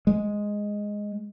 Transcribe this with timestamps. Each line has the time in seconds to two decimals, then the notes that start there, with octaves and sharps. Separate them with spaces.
0.07 G#3